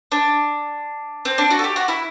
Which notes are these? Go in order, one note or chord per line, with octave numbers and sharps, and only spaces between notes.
D4
C4
D4
F#4
A4
G4
F#4
E4